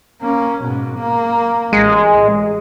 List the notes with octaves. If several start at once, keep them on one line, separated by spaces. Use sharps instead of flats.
A#3 C#4
G#2 B2
A#3
A1 G#3
A1